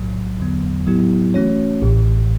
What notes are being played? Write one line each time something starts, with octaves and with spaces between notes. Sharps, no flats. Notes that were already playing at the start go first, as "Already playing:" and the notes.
Already playing: B1 A2 F#3
E2 D3 F#3 B3
A2 F#3 B3 E4 G4
E3 A3 C#4 F#4 C#5
A1 A2 E3